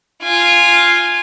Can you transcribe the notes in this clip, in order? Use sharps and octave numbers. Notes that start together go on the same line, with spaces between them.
F4 G#5